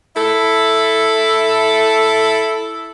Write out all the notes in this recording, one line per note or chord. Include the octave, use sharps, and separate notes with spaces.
E4 A4